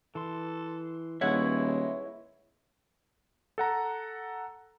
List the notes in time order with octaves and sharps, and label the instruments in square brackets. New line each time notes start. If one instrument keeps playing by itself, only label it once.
[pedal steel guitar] E3 C6 [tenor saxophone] A4
[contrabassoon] D#1 [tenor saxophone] G#3 [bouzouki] E4 C#5 F#5 [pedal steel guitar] B4 E5
[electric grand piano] A4 F#5 A#5